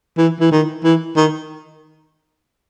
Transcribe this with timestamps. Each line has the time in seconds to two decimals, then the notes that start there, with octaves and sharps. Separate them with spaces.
0.17 E3
0.40 E3
0.51 D#3
0.84 E3
1.16 D#3